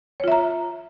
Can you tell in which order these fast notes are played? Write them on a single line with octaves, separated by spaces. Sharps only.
C#5 F4 E5 A#5